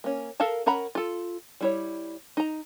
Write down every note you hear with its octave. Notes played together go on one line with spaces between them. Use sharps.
A#3 C#4
A4 A#4 F5 A5
C#4 A#4 F#5 A#5 B5
F4 A4
G3 E4 C#5
D#4 A#5